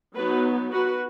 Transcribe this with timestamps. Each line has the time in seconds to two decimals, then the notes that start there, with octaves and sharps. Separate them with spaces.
0.15 F#3 B3 D#4 F#4 B4
0.72 F#4 B4